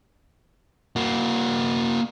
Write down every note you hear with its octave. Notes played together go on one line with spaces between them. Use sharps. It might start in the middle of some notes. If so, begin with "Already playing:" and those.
A#3 F#4